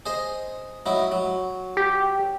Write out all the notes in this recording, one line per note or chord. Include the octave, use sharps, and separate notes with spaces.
G#4 C5 D#5
F#3 D#4 E4
F#3
G4